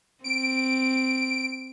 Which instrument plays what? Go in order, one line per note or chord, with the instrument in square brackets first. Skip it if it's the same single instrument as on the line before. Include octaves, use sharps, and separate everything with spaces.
[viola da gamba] C4 [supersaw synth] D7